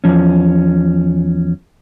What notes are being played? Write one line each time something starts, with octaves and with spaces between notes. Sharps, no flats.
E2 F3 C#4